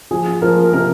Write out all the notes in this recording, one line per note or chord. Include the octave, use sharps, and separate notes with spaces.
F3 G#4
F3 A#4
C3 A#4